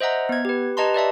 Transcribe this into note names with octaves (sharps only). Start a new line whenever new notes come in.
C5 D#5 E5 F#5 A#5
B3 G#6
G4 B4
G4 B4 D#5 A5 A#5 C6
B4 D5 E5 A5